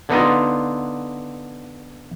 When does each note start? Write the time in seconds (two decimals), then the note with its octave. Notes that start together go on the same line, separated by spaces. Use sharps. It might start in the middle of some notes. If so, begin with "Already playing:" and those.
0.09 D3 B3 D#4 F4